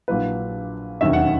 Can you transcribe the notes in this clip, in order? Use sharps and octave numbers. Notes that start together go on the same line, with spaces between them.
A#1 A#2 F#3 A#3 E4 B4
E1 D#2 D#3 F#3 C#4 E5
F#5